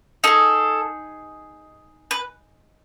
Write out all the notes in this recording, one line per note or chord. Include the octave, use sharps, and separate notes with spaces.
D#4 G#4 A4
B4